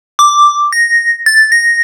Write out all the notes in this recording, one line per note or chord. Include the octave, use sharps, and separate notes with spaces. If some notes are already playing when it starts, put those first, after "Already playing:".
D6
A#6
A6
A#6